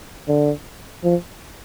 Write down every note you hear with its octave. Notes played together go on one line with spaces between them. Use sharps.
D3
F3